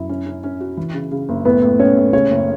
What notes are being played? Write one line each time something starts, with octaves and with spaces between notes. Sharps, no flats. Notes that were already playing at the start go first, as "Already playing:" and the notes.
Already playing: F#2 E4
C#4
C#4
C#4
F#4
E3
C#3
C#3
F#1
A2 B3 B4
A2
A2 C#4 C#5
A2
C#3 C#4 C#5
F#1